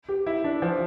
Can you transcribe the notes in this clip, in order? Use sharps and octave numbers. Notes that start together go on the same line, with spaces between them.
G4
E4
D4
F3